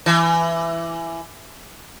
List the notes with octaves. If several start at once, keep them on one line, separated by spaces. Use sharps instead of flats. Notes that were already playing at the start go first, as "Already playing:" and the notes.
E3